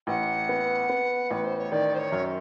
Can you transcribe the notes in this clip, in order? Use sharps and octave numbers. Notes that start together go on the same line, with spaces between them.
A1 F#5
B3
B3
A1 B4
C5
C#5
D#3 D5
C5
C#5
F#2